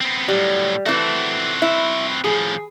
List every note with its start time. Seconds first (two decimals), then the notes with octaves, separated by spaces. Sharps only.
0.01 B3 C4
0.28 A2 F#3 G3
0.86 E3 A3 C4 F#4
1.62 E4
2.24 A2 F3 G#4